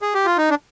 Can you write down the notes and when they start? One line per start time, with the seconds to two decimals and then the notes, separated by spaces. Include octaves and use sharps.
0.02 G#4
0.14 G4
0.25 F4
0.38 D#4
0.50 D4